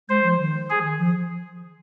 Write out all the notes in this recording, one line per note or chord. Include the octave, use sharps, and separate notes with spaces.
G#3 C5
F3
D#3
G#4
F3